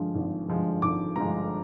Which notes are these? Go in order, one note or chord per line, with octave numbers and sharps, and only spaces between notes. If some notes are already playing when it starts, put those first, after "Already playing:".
Already playing: G2 D3 F3 G#3
G#1
G2 D3 F3 G#3
G#1 D6
G2 D3 F3 G#3 A#5